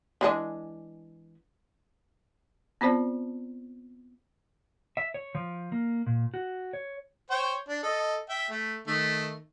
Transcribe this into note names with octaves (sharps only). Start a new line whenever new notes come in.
E3 G#3 D4
B3 C4 F4 C5 D5 A5
E5
C#5
F3
A#3
A#2
F#4
C#5
C5 C#5 G5
D4
A4 D#5
E5 G5
A3
D#3 A3